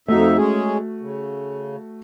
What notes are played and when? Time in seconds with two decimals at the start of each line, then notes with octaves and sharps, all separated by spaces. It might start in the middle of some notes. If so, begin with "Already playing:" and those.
0.08 F2 A3 D#4 F#4 E5
0.37 G#3 C#4 G#4
1.01 C#3